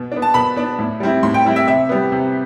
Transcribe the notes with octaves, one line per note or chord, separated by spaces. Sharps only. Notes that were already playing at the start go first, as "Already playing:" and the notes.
Already playing: B2
B3 D4
A5
B2 B5
B3 D4
A2
G3 C4 E4
A2 C6
G5
G3 C4 E4
E5
C3 E5
G3 B3
C3